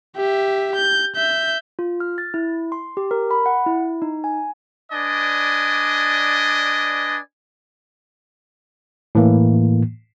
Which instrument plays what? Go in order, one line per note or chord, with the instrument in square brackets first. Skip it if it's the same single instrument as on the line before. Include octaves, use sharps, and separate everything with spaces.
[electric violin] G4 E5
G6
E5 G6
[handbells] F4
F6
A6
E4
C6
G4
A#4
B5
F#5
E4
D#4
G#5
[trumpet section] D4 B4 D5 D#5 G#5
[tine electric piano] A2 E3 A#3